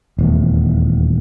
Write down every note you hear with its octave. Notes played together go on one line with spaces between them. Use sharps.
D#1 E2 A3